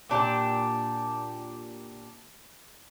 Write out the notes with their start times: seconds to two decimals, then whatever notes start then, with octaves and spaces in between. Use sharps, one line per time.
0.09 A#2 D4 G4